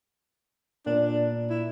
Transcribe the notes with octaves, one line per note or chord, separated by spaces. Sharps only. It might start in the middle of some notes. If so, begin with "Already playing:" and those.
A#2 D4
E4